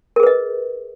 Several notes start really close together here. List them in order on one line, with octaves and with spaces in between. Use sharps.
A#4 G#4 B4 D#5